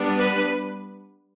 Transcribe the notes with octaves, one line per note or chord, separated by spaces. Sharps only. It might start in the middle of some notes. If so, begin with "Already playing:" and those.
Already playing: G3 B3 D4
B4